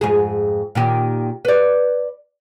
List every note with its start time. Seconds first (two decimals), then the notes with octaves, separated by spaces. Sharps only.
0.01 F2 G#2 G#4
0.75 A#2 D#3 G4
1.45 B4 D5